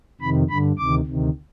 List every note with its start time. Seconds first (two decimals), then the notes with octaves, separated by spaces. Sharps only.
0.21 F2 C3 D#3 B5
0.49 G2 D3 B5
0.78 D2 C3 D#3 D6
1.06 D2 C3 D#3